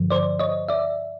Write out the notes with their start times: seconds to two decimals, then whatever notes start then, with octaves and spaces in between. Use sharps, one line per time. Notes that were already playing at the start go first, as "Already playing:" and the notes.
Already playing: G2 D3 F3
0.10 C5 D5
0.39 C#5 D#5
0.69 D5 E5